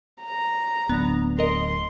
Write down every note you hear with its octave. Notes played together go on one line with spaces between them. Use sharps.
A#5
D1 B3 D4
A#4 D#5 C6